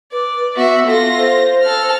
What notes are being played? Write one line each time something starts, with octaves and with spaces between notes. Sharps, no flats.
B4 D5
B3 F#4 E5
F4 A4 A#6
C5
A4 F6